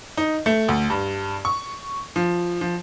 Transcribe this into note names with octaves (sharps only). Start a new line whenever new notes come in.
D#4
A3
D2
G2
C#6
F3
F3